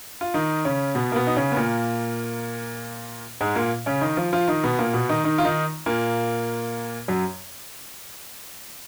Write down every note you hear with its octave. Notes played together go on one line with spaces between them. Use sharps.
F4
D#3 D#4
C#3 C#4
B2 B3
A#3
B2 B3
D#4
C#3 C#4
B3
A#2 A#3
G#2 G#3
A#2 A#3
C#3 C#4
D#3 D#4
F3 F4
F3 F4
D#3 D#4
B2 B3
A#2 A#3
B2 B3
D#3 D#4
D#3 D#4
F4
D#3 D#4
A#2 A#3
F#2 F#3